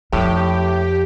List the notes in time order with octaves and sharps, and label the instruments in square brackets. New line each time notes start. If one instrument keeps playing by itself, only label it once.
[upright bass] F2 D4 [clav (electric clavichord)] A2 [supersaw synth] G4